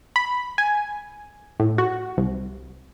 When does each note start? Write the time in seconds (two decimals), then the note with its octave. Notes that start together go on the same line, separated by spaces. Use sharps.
0.16 B5
0.58 G#5
1.60 A2
1.78 F#4
2.17 C2